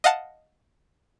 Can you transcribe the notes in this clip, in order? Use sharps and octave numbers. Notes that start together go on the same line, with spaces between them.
D#5 F5 F#5 A5